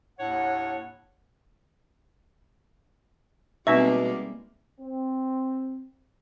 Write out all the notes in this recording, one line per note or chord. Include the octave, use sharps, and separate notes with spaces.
D#2 A2 D4 C#5 F#5
B2 G3 G#3 A#3 C4 D#4 E5 C#6
C4